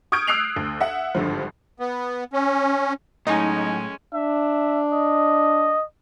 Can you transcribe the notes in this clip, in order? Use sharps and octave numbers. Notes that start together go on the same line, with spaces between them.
C#6 D#6 F6 G6 G#6 D7
D#6 E6 F#6 C7 D7 F7
D2
E5 F#5
G#1 G2 D3 F3
B3
C#4
A2 F#3 G#3 C#4 D#4 G#5
D4 E5
D#5